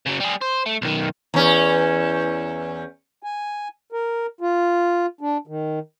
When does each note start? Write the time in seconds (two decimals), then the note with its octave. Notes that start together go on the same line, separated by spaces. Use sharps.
0.06 C#3 F#3
0.20 G3 G#4
0.41 C5
0.66 A3
0.82 B1 D#3
1.34 E2 C#4
3.23 G#5
3.92 A#4
4.41 F4
5.21 D4
5.47 D#3